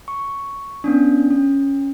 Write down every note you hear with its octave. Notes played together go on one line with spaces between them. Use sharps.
C#6
B3 C#4 D4
C#4